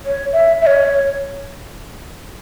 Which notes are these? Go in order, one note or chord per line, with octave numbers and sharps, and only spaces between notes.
C#5
E5
E5
C#5